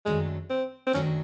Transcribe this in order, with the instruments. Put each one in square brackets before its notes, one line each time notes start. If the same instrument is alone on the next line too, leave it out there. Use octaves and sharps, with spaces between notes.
[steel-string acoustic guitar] F#2 D#3 F#3 A3 D4 [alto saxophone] G#3
[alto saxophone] C4
C4
[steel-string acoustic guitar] F#2 D#3 F#3 A3 D4 [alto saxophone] C#4